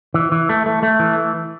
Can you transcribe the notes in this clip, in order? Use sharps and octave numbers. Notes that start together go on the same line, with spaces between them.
E3
E3
A3
A3
A3
E3